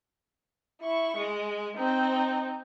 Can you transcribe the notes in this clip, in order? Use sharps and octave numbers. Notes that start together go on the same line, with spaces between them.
E4 C#6
G#3
C4 D#4